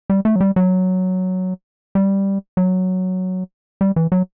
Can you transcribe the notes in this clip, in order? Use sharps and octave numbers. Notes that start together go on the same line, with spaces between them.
G3
A3
F#3
G3
F#3
G3
F#3
G3
E3
F#3